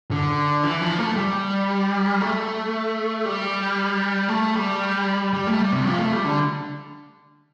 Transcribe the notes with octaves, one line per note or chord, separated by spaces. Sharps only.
D3
E3
F3
A3
G3
A3
G3
A3
G3
G3
A3
G3
C3
F3
A3
G3
D3